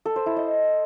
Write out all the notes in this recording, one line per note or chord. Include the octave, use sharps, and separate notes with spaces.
A4
C5
E4
D#5